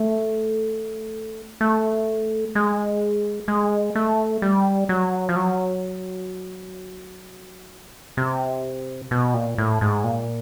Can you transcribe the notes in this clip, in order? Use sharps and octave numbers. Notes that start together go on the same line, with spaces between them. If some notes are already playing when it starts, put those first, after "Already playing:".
Already playing: A3
A3
G#3
G#3
A3
G3
F#3
F3
F#3
C3
B2
A#2
A2
G#2
A#2